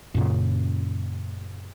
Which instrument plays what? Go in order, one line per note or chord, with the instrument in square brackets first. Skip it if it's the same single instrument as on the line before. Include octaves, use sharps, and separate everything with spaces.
[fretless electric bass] F#2 A#2 C#3